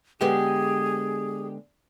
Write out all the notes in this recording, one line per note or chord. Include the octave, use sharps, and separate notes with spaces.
D3 G#3 B3 G4 G#4